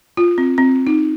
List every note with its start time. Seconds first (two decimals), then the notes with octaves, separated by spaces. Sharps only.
0.17 F4
0.38 C4
0.58 C4
0.87 D#4